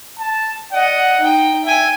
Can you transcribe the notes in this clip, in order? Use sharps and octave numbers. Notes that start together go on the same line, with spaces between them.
A5
D5 D#5 F#5
D#4 G5
E5 G5 G#5